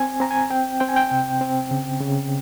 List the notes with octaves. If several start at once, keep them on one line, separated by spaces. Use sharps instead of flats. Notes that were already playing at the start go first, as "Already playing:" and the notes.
Already playing: C4 G#5
C4 A#5
G#5
C4 G5
C4 G5
G#5
G5
C3
C4
C#3
C#3